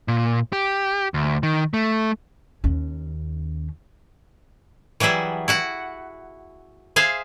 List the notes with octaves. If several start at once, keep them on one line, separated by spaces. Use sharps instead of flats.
A#2
G4
D2
D#3
A3
D#2 C#4
E3 F#3 G3 G#4 E5
E4 F#4 F#5
G#4 C5 E5 F5